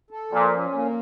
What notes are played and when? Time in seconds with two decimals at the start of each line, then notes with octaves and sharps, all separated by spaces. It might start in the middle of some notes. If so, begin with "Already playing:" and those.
0.10 A4
0.32 A#2 F3
0.54 C#4
0.74 A#3